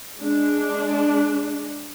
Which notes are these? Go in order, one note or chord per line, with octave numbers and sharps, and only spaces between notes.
G#3 D4